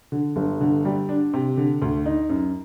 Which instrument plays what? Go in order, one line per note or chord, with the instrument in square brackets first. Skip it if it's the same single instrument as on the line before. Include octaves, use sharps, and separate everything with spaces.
[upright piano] D3
G1
D3
G3
D4
C3
D3
D2
D#4
F#2